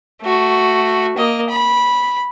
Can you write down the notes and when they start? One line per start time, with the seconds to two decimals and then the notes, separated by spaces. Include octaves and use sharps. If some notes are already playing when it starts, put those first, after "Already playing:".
0.23 A3 F#4
1.17 A#3 D#5
1.49 B5